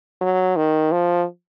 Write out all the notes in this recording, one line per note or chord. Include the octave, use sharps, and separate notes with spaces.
F#3
D#3
F3